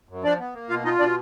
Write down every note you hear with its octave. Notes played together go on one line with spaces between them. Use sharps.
F#2
F3 D4 D5
B3
A#3
B2 F4 F5
D#4 F4 D#5
B2 D4 D5